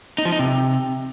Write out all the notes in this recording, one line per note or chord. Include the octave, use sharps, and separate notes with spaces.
D#4
F3
D#4
C3